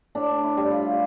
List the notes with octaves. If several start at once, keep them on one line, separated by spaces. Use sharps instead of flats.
A2 D4
E4
G3
F4